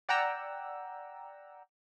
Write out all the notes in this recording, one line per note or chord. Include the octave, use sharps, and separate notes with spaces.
D5 F#5 G5 A#5 E6